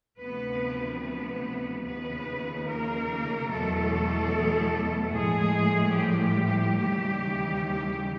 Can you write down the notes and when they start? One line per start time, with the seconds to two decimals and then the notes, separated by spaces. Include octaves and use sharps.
0.19 D2 C3 F3 B3 B4
1.02 B3 B4
1.84 D#2 C#3 F3 B3 B4
2.67 A#3 A#4
3.49 E2 B2 F#3 A3 A4
5.14 A2 F3 G#3 G#4
5.97 G3 G4
6.79 D#2 C#3 E3